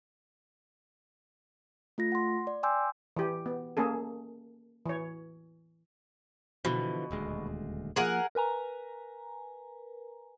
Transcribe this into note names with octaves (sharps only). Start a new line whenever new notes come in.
A3 F4 A#6
F#5 C6
D5
G5 G#5 C6 D6 E6 G6
E3 G4
B3
A#3 C#4 G#4 A4
E3 C#5
B2 D3 E3 F3
D#1 D2 G#3
F3 A#3 G#4 A#4 F#5
A#4 B4 G#5 A#5